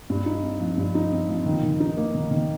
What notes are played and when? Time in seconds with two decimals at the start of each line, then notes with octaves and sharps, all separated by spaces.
0.10 G2
0.26 D#4
0.43 C4
0.60 F3
0.77 G2
0.95 D#4
1.12 C4
1.29 F3
1.46 D#3
1.63 D#3
1.80 D#4
1.97 A#3
2.15 D#3
2.31 D#3